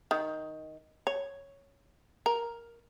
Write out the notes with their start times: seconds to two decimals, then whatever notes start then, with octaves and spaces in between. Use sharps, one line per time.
0.11 D#3
1.07 C#5
2.26 A#4